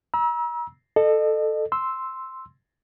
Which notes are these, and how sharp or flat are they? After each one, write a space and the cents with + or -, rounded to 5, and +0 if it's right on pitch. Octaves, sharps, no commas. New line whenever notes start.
A#5 +40 E6 -20
A4 +0 D#5 -35
C6 +0 E6 -5